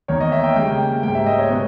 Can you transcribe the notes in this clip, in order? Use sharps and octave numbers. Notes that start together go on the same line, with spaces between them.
E2 D#3 A#3 C#5
D#5
E5
G5
C#3 G3 A#3 G5
G#2 G3 A#3 G5
E5
D#5
C#5
B2 G#3 B3